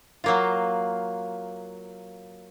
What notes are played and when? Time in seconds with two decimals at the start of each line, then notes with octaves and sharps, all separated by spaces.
0.24 F#3 A#3 F4